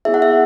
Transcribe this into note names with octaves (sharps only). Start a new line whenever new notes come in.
B3 E4 G#4 E5
F#5
E5